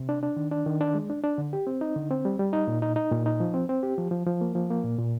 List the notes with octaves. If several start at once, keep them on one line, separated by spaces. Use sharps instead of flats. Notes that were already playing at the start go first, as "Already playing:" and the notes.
Already playing: C3
D4
D4
D#3
D4
D#3
D4
G#3
D4
D4
D3
G4
C4
D#4
D3
C4
G3
G3
D#4
A#2
D#4
D#4
A#2
D#4
F3
C4
C4
G4
F3
F3
F3
A#3
F3
A#3
A#2
A#2